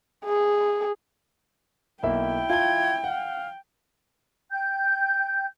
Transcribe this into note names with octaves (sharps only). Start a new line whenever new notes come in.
G#4
B1 A#3 E4 E5 G5
F4 A5 G#6 G7
F5 F#5
G5 G6